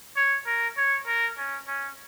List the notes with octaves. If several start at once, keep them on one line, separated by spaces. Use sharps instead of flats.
C#5
A#4
C#5
A#4
C#4
C#4